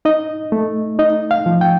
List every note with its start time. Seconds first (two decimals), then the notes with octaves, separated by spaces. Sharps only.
0.05 D#4 D#5
0.52 A3
0.99 D#4 D#5
1.31 F5
1.46 F3
1.61 G5